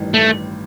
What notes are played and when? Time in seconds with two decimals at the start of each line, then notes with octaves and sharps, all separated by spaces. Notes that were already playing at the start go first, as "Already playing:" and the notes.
Already playing: A1 G2 D#3
0.14 A3